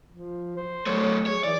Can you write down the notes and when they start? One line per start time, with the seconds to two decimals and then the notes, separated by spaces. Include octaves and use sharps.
0.10 F3
0.56 C5
0.86 F#3 A3 C#5
1.26 G#4 C#5
1.44 E3 D5